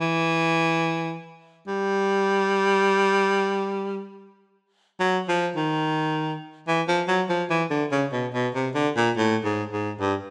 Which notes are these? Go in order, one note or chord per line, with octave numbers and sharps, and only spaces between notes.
E3
G3
F#3
F3
D#3
E3
F3
F#3
F3
E3
D3
C#3
B2
B2
C3
D3
A#2
A2
G#2
G#2
G2